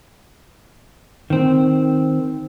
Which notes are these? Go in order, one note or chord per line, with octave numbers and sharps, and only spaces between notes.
D#3 C4